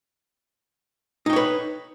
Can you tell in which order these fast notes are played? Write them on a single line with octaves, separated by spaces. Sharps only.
D#4 G5 C#5 B4